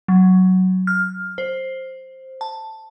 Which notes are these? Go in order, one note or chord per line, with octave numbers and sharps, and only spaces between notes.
F#3
F6
C5
A5